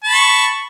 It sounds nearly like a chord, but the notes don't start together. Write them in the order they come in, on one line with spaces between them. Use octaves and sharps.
A5 B5 C#6